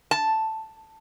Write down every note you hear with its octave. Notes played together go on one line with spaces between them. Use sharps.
A5